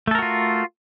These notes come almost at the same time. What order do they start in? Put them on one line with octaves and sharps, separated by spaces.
A3 A4 A#4 F#4 F4